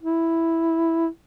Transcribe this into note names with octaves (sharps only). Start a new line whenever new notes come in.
E4